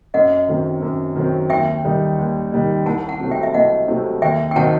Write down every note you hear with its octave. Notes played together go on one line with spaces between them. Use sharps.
F#2 D#5 F#5
D#3 F#3 C4
F#2
D#3 F#3 C4
D#2 E5 G5
D#3 G3 D#4
D#2
D#3 G3 D#4
C2 F#5 A5
F#5 A5
C3 F#3 A3 C4
E5 G5
E5
C2 D#5 F#5
C3 F#3 A3 C4
D#2 E5 G5
G5
D#3 F#3 C4 D#4 F#5 A5